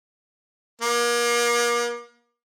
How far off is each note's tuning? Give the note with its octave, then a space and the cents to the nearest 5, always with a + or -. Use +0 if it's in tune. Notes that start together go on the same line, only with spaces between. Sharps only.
A#3 +40